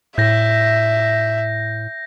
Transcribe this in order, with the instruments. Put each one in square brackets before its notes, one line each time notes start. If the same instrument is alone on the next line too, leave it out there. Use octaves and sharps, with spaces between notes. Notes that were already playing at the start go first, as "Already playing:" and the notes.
[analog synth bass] A2 [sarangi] E5 [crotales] G6 A#6